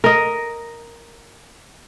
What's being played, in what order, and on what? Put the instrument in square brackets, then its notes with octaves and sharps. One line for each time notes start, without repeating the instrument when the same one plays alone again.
[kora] A#4 D#5